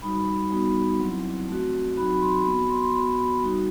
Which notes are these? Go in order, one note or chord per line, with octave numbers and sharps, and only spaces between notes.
G3 D#4 F#4 B5
G3 B3 D#4 F#4
F#3 C4 E4
A3 C4 F#4
F#3 C4 D#4 F#4 B5
B5
C6
B3 F#4 B5
C6
C6
B3 F#4 B5
B5
G3 D#4 F#4